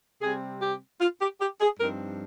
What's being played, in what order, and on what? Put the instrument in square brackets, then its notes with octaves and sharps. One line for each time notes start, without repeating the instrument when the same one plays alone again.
[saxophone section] C3 G3 C4 G#4
G4
F4
G4
G4
G#4
G2 F3 C4 D#4 A#4